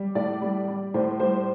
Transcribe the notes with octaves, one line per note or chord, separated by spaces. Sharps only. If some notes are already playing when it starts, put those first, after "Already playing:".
Already playing: G3
A2 D5
G3
G3
A2 C5
G3 C5